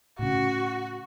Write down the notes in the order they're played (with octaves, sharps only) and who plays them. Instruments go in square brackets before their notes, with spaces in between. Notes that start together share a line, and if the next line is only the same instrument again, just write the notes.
[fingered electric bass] A2 C#3 [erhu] F#4